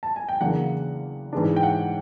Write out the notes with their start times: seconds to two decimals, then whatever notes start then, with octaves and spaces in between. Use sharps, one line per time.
0.03 A5
0.16 G#5
0.29 G5
0.40 E2 C#3 F#3 A#3 D4 F#5
1.33 G#2 E3 G#3 B3 D4
1.56 G5
1.63 F#5